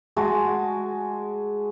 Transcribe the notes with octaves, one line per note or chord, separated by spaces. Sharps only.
G#3 F#4 G#5 A5